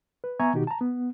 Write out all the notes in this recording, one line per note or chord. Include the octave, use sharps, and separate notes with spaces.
B4
B3 E5 G#5 A#5 C#6 G#6
B2 D#3 D#4 F#4 G4
A5 A#5
B3